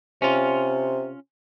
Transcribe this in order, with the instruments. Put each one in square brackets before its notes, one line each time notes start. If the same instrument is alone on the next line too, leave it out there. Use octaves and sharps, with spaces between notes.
[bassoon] C3 [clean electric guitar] C#4 F4